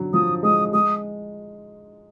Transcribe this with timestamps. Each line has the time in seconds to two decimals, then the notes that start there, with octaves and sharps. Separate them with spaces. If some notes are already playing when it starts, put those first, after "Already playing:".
Already playing: D3 F#3
0.13 F3 D#6
0.43 G#3 D#6
0.73 G#3 D#6